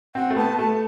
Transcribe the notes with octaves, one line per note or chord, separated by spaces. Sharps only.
C4 F#5
A3
B3 A5
A3 A5